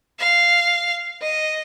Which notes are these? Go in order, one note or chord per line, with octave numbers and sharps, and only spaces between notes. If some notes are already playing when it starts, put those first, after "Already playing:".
F5
D#5